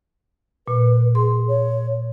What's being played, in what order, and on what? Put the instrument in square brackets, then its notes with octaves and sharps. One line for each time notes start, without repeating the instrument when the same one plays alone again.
[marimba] A#2 [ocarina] B4
[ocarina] G#4 [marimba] C6
[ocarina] C#5